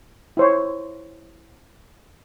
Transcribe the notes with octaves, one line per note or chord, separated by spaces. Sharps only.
E4 C5 C#5